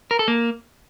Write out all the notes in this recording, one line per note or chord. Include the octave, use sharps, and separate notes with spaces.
A#4
A4
A#3